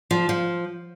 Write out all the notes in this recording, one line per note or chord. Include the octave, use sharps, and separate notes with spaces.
F3
F3